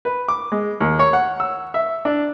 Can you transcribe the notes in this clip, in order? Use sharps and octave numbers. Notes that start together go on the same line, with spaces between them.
B4
D6
G#3
D#2
C#5
F#5
E6
E5
D4